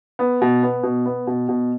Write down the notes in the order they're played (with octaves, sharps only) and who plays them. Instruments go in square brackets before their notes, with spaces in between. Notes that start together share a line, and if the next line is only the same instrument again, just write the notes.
[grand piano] B3
B2
B3
B2
B3
B2
B2